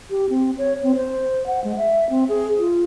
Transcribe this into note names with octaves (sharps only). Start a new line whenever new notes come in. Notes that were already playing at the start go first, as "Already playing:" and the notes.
G4
C4
C#5
C4
C5
F#5
G#3
E5
C4
G#4
F4